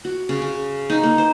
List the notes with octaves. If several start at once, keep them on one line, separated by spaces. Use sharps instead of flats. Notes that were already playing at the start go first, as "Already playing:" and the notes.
F#4
C#3
C#3
D#4
A#3
C5